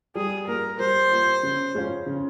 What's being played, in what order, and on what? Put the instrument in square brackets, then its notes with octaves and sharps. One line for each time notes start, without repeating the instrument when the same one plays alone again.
[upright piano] G3 [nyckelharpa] G#4
[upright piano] A#3 F4 [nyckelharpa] A#4
[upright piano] G3 [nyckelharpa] C5
[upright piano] A#3 F4
C#3
G#3 C#4 F4
C#3